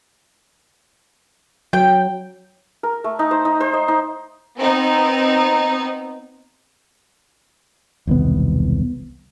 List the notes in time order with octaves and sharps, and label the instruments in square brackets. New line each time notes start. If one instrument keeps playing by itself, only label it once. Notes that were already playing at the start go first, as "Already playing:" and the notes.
[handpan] F#3 [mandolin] G5
[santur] A#4
A3
D#4
C5
D#4
C5
D#5
D#4
[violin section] B3 C4 D#4
[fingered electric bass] E1 C2 D#3 B3